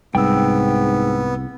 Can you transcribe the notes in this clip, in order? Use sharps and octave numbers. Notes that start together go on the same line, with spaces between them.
C2 G#2 B3 G5 E6